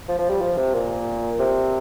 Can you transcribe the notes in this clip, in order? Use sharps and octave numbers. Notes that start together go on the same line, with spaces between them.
F3
F3
G3
F3
C3
A#2
C3